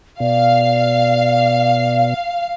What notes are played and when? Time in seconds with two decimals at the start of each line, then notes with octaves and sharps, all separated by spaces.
0.20 B2 D5 F5